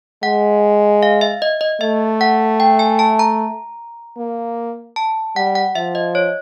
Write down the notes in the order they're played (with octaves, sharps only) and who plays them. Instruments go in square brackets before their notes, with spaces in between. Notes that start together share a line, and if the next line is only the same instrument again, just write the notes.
[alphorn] G#3 [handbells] F#5
[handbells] F5
E5
D#5
D#5
[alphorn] A3 [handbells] E5
[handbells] F#5
G5
G#5
A5
A#5
[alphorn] A#3
[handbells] A5
[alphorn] G3 [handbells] F#5
[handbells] F#5
[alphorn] F3 [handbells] E5
[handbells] D#5
C#5